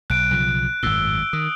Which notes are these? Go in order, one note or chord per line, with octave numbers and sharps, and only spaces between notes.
B1 F#6 D7
B1 C#3 F3
G#1 F#2 A2 E6 G7
D#3 D#6